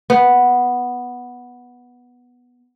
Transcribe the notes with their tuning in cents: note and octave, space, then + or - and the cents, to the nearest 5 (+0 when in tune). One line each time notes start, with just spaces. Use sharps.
B3 -5